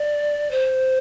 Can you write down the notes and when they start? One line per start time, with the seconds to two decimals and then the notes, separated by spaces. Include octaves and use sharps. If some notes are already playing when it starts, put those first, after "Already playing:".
Already playing: D5
0.51 C5